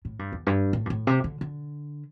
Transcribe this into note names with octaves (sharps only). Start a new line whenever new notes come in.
A2
G2
E2
G2
A2
G2
A2
C3
D3
D3